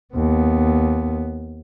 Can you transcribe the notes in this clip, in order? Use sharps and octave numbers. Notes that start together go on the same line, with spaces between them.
D#2 B3